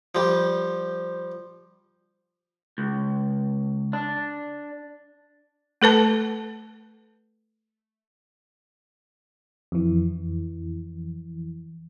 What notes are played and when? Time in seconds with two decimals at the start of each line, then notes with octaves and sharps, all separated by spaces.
0.15 F3 G3
2.78 C#2
3.93 D4
5.82 A3 A4 B4 A5
9.72 F2 E3